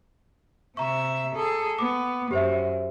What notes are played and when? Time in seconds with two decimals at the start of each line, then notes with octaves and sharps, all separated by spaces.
0.77 C3 E5 A#5 C#6
1.35 G#4 A4
1.79 B3 D6
2.31 F#2 G4 C5 E5